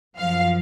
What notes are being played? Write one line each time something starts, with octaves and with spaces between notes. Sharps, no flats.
F#2 F3 F5